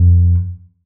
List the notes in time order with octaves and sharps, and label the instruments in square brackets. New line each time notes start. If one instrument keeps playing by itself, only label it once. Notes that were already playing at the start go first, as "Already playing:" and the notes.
Already playing: [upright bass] F2